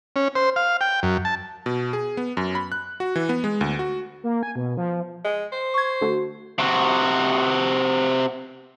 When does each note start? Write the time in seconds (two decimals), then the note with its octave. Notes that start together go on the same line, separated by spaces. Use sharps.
0.16 C#4
0.35 C5
0.56 F5
0.81 G5
1.03 F#2
1.25 A5
1.66 B2
1.93 G#4
2.17 B3
2.37 F#2
2.55 B5
2.72 F#6
3.00 F#4
3.16 E3
3.29 B3
3.44 G#3
3.61 D2
3.79 F#4
4.23 A#3
4.43 G#5
4.56 B2
4.77 F3
5.24 G#3
5.52 C5
5.74 C#6 G#6
6.01 D3 A3 F#4
6.59 C3 F#4